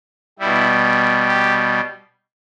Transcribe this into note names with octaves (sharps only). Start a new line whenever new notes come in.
B2 G3 E4
G4